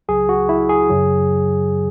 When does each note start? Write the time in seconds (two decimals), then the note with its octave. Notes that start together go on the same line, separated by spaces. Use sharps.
0.08 C#2 C#3 F#3 G#4
0.29 F#4
0.49 E4
0.69 G#4
0.90 F#2 C#3 F#3